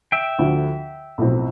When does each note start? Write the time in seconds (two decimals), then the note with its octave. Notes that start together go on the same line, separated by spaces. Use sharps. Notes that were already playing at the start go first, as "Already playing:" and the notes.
0.12 E5 G5
0.39 D2 D3 F3 A3
1.18 B1 A2 F3 C4